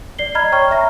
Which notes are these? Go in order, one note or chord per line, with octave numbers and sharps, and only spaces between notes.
D5 C7 G7
D#5 A#5 B5 F6 G#6
C#5 G5 A#5 C#6 F6
E5 A#5 A#6